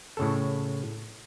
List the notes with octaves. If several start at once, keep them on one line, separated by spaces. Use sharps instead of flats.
A2 C#3 A4